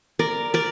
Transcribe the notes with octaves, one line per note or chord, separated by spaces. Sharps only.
A#4 D5
A#4 D5